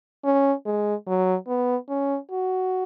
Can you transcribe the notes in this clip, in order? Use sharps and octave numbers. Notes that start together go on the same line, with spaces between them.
C#4
G#3
F#3
B3
C#4
F#4